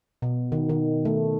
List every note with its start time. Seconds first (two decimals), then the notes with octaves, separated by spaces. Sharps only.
0.22 B2
0.52 D#3
0.69 D#3
1.05 A3